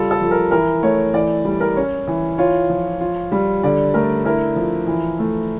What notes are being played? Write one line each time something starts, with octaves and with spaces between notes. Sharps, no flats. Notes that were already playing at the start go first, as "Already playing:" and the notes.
Already playing: C#3 G3 F4 A4
A4
F3
A#4
E3 A#4
A3 C#5
E3 D5
G3
A#4
C#4 C#5
E3
F4 C#5
F3
F4
G3
D3 D5
A3 A#4
E4 A#4
F3
E3
A3